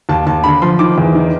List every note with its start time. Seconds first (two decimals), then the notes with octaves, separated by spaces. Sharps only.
0.09 D#2 A5
0.26 D#2 A5
0.44 D3 B5
0.62 F3 C6
0.79 D#3 D6
0.98 E2
1.15 D#3